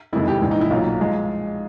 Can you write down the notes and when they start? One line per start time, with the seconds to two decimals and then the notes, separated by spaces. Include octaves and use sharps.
0.13 F2 C3 D#3 G#3 E4
0.28 G4
0.42 A#1 G#2 E3
0.51 D#4
0.61 E4
0.70 B1 A#2 F#3 F4
1.00 F3 G#3